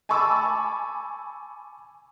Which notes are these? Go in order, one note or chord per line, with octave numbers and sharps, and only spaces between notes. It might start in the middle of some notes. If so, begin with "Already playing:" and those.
G#5 A5 B5 C#6 D6 E6